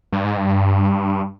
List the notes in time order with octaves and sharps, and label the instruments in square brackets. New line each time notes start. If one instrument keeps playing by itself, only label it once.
[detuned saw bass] G2
G#2
G2